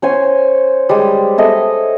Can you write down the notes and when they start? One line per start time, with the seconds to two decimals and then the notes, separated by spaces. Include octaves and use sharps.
0.02 C#4 C5 C#5 G#5
0.89 G3 G#3
1.38 A4 D#5 E5 G#5